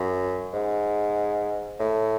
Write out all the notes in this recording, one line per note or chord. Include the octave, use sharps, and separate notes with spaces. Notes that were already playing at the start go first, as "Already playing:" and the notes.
Already playing: F#2
G#2
A2